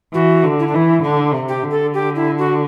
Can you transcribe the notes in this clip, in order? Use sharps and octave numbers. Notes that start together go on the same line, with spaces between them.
E3 F#4
D3
E4
D4
E3 E4
D3 D4
C3
G4
D3
A4
G4
E4
F#4